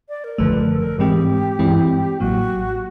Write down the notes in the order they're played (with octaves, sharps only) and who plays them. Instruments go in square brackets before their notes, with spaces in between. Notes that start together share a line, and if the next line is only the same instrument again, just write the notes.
[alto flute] D5
A#4
[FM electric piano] G1 F#2 D3 F3 A3 [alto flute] B4
[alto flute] A#4
A4
A#4
[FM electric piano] G#2 E3 G#3 C4 [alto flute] G4
[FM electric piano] G2 E3 G#3 C4 E4
[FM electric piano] A1 A2 F#3 A#3 [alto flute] F#4